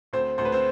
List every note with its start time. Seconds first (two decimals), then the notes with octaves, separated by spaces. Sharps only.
0.13 D2 C4 C5
0.38 D2 C5
0.45 B4
0.52 C4 C5